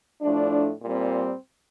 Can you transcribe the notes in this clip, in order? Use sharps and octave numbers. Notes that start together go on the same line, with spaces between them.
A2 F3 A3 D4
A#2 G3 C4